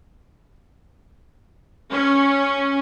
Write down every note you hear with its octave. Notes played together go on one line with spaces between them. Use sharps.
C#4